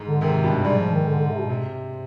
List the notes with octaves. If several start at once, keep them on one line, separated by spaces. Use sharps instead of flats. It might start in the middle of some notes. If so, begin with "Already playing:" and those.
Already playing: G#2
D3
G#2 C3 D#3
G2 B2
G#2 G3
F3
D#3
D3
D3
C3
B2
C3